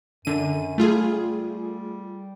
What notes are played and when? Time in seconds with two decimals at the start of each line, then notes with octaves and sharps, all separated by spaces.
0.25 F#2 D3 D#7
0.78 G3 A3 F4 G#4